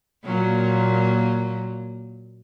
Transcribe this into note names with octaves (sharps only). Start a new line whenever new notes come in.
A#2 F#3 A#3